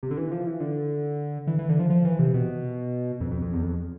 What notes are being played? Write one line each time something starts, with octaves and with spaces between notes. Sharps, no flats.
C3
D3
E3
F3
E3
D3
E3
E3
D3
F3
F3
E3
C3
B2
F2
F2
F2
E2
F2